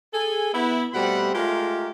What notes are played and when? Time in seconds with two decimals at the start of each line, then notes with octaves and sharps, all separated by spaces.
0.14 G#4 A4 G#5
0.53 B3 E4
0.93 B2 G3 A3 C4 F#5 B5
1.35 G#3 A3 F4 G4 A#4